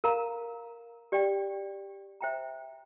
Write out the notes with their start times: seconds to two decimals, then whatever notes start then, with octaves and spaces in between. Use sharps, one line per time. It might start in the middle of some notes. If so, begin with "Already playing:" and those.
0.04 A#4 F5 A#5
1.12 G4 D5 G5
2.21 C5 E5 G5 A#5